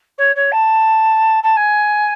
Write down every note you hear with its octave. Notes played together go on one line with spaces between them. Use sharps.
C#5
C#5
A5
A5
G#5